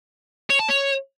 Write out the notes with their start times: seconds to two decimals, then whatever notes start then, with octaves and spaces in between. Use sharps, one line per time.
0.50 C#5
0.59 A5
0.68 C#5